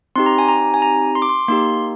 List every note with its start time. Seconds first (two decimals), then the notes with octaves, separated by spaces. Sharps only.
0.16 C4 D#4 G4 C6
0.26 A#5
0.38 G#5
0.48 A#5
0.74 G#5
0.82 A#5
1.15 C6
1.22 D6
1.29 C6
1.48 A#3 D#4 G4 C6